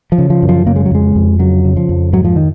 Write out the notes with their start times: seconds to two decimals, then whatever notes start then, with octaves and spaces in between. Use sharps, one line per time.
0.12 F3
0.18 C#3
0.30 F3
0.42 F#2
0.49 F3
0.67 C#3 A#3
0.76 G#3
0.86 F#3
0.91 F2 G#3
1.15 F2
1.39 C#3 F#3
1.64 C#3
1.77 F3
1.89 F2
2.13 G#2 F#3
2.25 F3
2.36 D#3